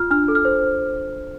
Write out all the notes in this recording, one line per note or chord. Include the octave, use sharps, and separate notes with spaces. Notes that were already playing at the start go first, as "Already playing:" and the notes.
Already playing: F4 F6
D4 F6
A4
F6
C5